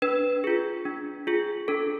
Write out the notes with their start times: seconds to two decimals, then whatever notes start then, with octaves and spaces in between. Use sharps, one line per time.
0.02 D4 B4
0.44 F4 G#4
0.85 D4
1.27 F4 G#4
1.68 D4 A4